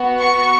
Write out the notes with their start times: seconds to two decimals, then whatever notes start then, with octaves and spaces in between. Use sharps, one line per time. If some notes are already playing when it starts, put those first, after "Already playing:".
Already playing: B3 F#4
0.19 C#6